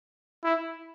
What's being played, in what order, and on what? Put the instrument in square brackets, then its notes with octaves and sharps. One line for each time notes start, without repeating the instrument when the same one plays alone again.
[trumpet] E4